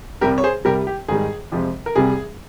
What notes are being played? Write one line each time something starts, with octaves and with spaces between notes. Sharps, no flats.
C2 C3 G3 G4 A#4
C#5
G#4 C5
C2 C3 G3 G4 A#4
G4
G#2 D#3 G3 G#4
F2 C3 F3 G#3
A#4
C2 C3 G3 G#4